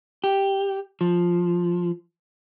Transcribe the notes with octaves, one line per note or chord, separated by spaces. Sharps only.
G4
F3